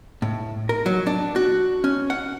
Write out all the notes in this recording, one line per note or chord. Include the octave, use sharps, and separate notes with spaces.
A2
A#4
F#3
D4
F#4
C#4
F#5